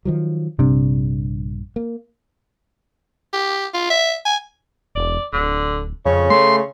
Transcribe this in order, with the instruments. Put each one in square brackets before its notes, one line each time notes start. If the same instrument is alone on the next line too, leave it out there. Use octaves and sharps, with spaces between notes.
[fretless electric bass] D#3 F3 F#3
[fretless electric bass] A#1 G2 D4 [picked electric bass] C3
[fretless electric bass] A#3
[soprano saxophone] G4
F4
E5
G#5
[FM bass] E1 [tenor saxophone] D5
[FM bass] D1 [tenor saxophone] D3
[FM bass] F2 [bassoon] C#3 [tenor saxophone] C#4
[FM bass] A3 [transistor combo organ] C6